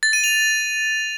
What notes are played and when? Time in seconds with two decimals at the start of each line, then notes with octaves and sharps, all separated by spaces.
0.03 A6
0.13 D#7
0.24 F7